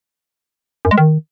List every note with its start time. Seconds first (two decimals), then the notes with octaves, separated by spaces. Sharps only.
0.85 F#2
0.91 G#3
0.98 D#3